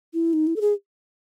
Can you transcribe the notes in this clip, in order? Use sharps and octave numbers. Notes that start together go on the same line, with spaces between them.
E4
D#4
E4
A4
G#4